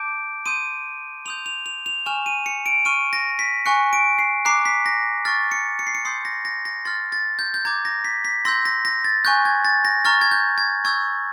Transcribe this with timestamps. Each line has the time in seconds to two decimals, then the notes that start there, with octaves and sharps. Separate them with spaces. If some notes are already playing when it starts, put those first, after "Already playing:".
Already playing: A5 D6 G6 D7
0.46 C6 D#6 G6 D#7
1.25 C6 D#6 G6 F7
1.46 F7
1.66 F7
1.86 F7
2.06 G#5 C#6 F6 E7
2.26 D#7
2.46 C#7
2.66 D7
2.85 C#6 F6 D#7
3.13 A#6
3.39 B6
3.65 G#5 C#6 F#6 C#7
3.93 D7
4.19 C7
4.45 A#5 D6 F#6 C7
4.65 B6
4.86 A#6
5.25 C#6 F6 A6
5.52 C#7
5.79 C#7
5.87 C7
5.95 C#7
6.05 C6 D#6 G6 C7
6.25 A#6
6.45 A#6
6.65 A#6
6.85 C6 F6 A6
7.12 A6
7.39 G6
7.54 G6
7.65 A#5 D6 G6 G#6
7.85 A#6
8.05 B6
8.25 B6
8.45 C6 E6 G6 A#6
8.65 A#6
8.85 A#6
9.04 A6
9.25 G#5 C#6 F#6 G6
9.45 G#6
9.65 A6
9.85 A#6
10.05 A#5 C#6 F6 A6
10.21 G#6
10.31 G6
10.58 G#6
10.84 C#6 E6 G6 G#6